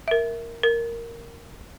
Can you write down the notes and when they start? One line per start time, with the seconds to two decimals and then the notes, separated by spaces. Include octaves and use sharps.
0.08 A#4 E5
0.63 A#4